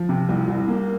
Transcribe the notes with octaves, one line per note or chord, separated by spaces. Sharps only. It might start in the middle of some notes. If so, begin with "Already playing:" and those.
Already playing: F3
C3
C2
C2
A#3